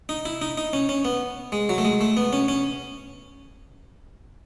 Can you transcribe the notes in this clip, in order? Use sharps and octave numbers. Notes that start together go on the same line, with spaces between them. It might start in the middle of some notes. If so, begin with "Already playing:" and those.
D#4
E4
D#4
D#4
C#4
C#4
B3
G#3
F#3
A3
G#3
A3
B3
C#4
C#4